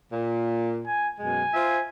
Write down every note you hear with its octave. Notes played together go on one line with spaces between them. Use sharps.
A#2
G#5
F#2 B2 G#3 G#5
F4 C5 E5